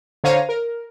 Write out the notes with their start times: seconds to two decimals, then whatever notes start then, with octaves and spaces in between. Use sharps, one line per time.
0.24 D3 C5 C#5 F5 A#5 D#7
0.49 A#4